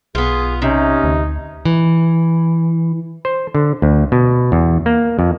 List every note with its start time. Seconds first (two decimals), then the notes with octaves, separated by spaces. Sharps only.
0.15 B1 B3 F4 G#4
0.62 C3 C#4 D#4
1.04 D2
1.65 E3
3.25 C5
3.55 D3
3.82 D2
4.12 B2
4.52 E2
4.86 A#3
5.19 F2